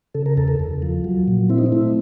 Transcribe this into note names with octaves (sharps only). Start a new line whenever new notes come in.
C#3 A4
A#4
E2 A4
A4
E2
F3
F#3
A#2
C4 E4
D#4
E4
A3